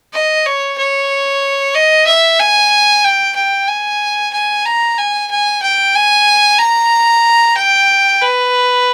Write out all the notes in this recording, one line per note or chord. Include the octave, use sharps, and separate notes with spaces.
D#5
C#5
C#5
D#5
E5
G#5
G5
G5
G#5
G#5
A#5
G#5
G#5
G5
G#5
A#5
G5
B4